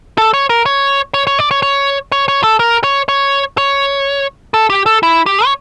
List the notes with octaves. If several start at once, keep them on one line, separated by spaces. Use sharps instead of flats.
A4
C#5
A#4
C#5
C#5
C#5
D5
C#5
C#5
C#5
C#5
A4
A#4
C#5
C#5
C#5
A4
G4
A4
E4
G4
C#5